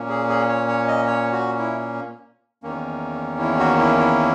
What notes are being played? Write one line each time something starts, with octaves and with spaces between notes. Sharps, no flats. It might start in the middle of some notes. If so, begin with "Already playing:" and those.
Already playing: A#2 A#3 C#4
G#4
G#4
C#5
C#5
D#5
C#5
F#4
E4
E2 D#3 A#3 C#4
E4
F#4
E4
E4